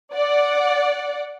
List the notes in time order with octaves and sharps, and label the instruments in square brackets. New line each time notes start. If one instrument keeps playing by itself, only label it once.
[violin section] D5 F#5